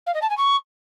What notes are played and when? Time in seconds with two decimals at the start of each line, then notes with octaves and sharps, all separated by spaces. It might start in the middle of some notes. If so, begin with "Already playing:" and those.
0.06 F5
0.14 D#5
0.22 A5
0.30 G#5
0.37 C#6